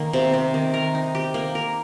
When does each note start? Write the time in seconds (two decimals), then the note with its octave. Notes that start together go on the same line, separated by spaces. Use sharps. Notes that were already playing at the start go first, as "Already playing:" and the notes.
Already playing: D#3 A#3
0.13 C3
0.34 C3
0.54 D#3
0.74 A#4
0.95 D#4
1.15 G4
1.34 A#3
1.55 A#4